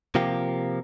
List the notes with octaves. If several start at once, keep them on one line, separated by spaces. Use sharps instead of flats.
C3 F3 A#3 G4